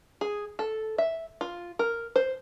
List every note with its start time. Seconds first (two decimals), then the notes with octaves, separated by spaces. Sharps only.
0.21 G#4
0.59 A4
0.98 E5
1.41 F4
1.79 A#4
2.16 C5